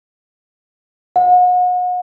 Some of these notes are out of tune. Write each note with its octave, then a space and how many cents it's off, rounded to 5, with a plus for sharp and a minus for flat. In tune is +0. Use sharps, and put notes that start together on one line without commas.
F#5 -40